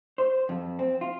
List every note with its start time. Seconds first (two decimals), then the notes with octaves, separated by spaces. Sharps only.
0.18 C5
0.49 F2
0.79 C4
1.01 F4